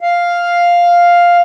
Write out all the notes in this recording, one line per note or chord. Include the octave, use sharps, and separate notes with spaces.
F5